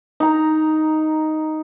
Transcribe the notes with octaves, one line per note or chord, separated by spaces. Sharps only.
D#4 A#5